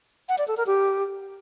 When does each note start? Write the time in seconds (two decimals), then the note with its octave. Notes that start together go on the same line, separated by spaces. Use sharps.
0.29 F#5
0.38 D5
0.48 A4
0.57 A#4
0.67 G4